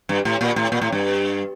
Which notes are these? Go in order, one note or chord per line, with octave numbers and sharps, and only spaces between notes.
G2
A2
A#2
A2
A#2
A2
G2